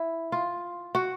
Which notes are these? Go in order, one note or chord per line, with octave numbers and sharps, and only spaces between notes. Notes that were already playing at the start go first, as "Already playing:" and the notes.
Already playing: E4
F4
F#4